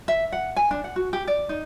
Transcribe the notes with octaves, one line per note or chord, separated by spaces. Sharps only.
E5
F#5
G#5
D4
F#5
F#4
G4
D5
D#4